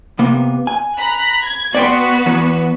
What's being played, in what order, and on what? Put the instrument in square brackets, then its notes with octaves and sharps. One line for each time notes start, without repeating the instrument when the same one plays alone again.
[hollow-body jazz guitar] C3 A#3 B3
G#5
[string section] A#5 B5 F#6
G#6
[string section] B3 F#4 B4 [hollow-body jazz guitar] D5 G5 C6
[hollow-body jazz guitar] E2